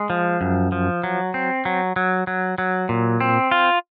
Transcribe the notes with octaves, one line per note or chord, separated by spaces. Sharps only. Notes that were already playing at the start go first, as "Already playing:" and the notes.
Already playing: G#3
F3
F#2
F3
F#3
C4
F#3
F#3
F#3
F#3
A#2
C4
F4